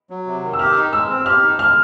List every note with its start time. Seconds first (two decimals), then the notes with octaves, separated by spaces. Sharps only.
0.10 F#3
0.26 C3
0.43 D#3
0.53 E6
0.59 G4 F6
0.76 D#4
0.93 G#3 E6
1.10 C4
1.26 G4 F6
1.42 D#4
1.59 G#3 F6